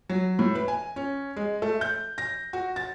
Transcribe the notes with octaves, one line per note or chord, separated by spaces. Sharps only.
F#3
A2
B4
G#5
C#4
G#3
A3
G6
A#6
F#4
A6